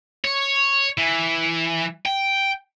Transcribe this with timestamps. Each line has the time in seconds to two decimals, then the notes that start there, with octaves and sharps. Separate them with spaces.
0.25 C#5
0.98 E3
2.06 G5